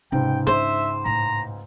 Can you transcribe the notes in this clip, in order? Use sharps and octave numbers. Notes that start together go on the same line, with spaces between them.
C#2 G#2 C3 G5
D4 C5 E5
A2 A#5